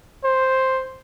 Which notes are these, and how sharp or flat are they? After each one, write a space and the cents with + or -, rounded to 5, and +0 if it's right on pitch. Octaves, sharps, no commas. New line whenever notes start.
C5 +5